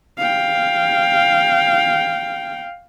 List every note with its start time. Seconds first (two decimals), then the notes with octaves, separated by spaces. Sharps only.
0.18 F5 G5